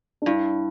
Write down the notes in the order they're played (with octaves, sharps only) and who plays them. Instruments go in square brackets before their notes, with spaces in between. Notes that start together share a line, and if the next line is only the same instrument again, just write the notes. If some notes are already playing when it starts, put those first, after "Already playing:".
[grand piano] D4
[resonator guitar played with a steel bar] G2 [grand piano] E4